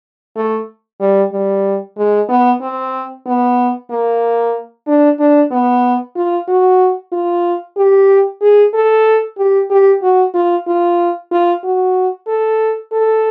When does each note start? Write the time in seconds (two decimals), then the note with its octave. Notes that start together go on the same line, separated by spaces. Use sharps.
0.36 A3
1.00 G3
1.32 G3
1.98 G#3
2.29 B3
2.61 C4
3.26 B3
3.90 A#3
4.87 D4
5.19 D4
5.51 B3
6.16 F4
6.48 F#4
7.12 F4
7.77 G4
8.41 G#4
8.74 A4
9.38 G4
9.70 G4
10.02 F#4
10.34 F4
10.67 F4
11.31 F4
11.63 F#4
12.28 A4
12.92 A4